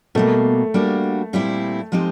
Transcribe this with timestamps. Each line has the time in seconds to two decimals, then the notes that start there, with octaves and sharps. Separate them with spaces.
0.15 B2 G3 A3 A#3
0.74 G3 A#3 D4 F#4
1.33 A#2 G3 C4 E4
1.92 F3 G#3 C4 D#4 G4